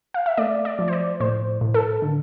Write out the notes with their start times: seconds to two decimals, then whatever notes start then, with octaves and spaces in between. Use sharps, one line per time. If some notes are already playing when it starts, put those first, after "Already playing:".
0.14 F5
0.26 E5
0.37 A3 D5
0.65 D5
0.79 F3
0.88 C5
0.93 D5
1.20 A2 C5
1.61 A2
1.74 A4
2.02 D3